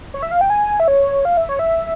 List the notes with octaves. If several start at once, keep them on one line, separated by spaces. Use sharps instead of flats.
C#5
E5
F5
G5
G#5
E5
C#5
F5
E5
C#5
E5